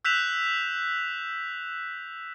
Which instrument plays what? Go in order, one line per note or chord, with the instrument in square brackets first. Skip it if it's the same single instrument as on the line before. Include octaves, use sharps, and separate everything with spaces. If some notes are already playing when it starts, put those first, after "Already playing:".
[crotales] E6 F#6 G6 B6 E7 F7